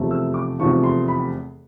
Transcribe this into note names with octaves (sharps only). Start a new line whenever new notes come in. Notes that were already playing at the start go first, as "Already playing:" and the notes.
Already playing: F1 E2 C3 F3 A3
E6
D6
F1 E2 C3 F3 A3 C#6
C6
B5